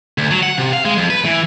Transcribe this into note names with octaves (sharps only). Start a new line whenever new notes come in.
D2
F#3
F#5
C3
F5
G#3
F2
B4
E3